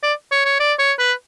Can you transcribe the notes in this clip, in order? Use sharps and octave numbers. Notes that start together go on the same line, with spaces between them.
D5
C#5
C#5
D5
C#5
B4